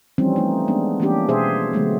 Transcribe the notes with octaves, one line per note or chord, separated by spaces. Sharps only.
E3 F3 G3 C4 C#4 D#4
G3 A3 D#4
G#3 B3 D4
E3 A#3 C#4 D4 G4
B2 G#4 C5 E5
D3 F#3 G#3 A3 B3